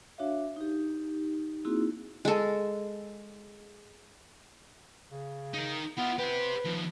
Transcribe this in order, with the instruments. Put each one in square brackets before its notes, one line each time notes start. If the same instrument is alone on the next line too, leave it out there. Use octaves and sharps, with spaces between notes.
[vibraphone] D4 F#4 C#5 E5 F5
D#4 G4
A#3 C4 D#4 E4 F#4 G#4
[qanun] G#3 A4
[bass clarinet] C#3
[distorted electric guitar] D#4 A#4
[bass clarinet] B3 [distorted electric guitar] E4 F4
[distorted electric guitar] G4 C5 [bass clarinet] B4
[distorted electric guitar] D#2 F3